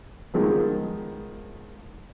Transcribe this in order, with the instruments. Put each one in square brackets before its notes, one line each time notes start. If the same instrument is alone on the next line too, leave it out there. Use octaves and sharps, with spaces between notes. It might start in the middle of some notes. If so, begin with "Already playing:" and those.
[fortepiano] D#3 F3 G#3 B3